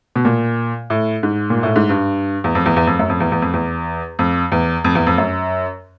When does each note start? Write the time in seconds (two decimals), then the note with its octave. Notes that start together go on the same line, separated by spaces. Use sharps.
0.16 B2
0.25 A#2
0.90 A2
1.23 G#2
1.50 A#2
1.63 A2
1.76 G#2
1.89 G2
2.44 E2
2.55 F2
2.66 E2
2.76 E2
2.87 F2
2.99 F#2
3.10 F2
3.20 E2
3.32 E2
3.42 F2
3.54 E2
4.19 F2
4.52 E2
4.84 F2
4.95 E2
5.07 F2
5.18 F#2